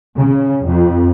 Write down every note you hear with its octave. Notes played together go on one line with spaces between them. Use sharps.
C#3
F2